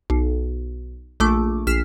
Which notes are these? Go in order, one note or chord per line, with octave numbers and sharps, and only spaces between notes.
B1
A#1 A3 D6
A#1 F6 B6 C7 E7